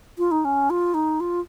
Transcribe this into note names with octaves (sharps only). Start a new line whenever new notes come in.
F4
D#4
C#4
F4
D#4
F4